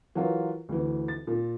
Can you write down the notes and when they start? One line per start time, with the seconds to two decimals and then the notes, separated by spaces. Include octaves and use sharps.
0.15 E3 F#3 F4 A#4
0.69 D2 E3
1.08 A6
1.27 A#2